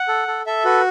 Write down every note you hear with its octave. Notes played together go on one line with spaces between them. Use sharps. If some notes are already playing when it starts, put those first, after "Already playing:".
Already playing: F#5
A4
A4
A4 E5
F#4 B4